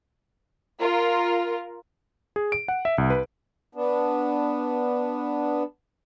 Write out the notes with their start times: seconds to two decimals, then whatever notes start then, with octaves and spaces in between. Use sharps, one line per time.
0.80 F4 A#4
2.36 G#4
2.52 D7
2.68 F#5
2.85 E5
2.98 C2
3.10 B4
3.75 B3 D4